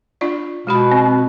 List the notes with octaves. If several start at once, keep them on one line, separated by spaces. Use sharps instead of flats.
D4 F4 D5
B2 G#3 F#4 B5
C4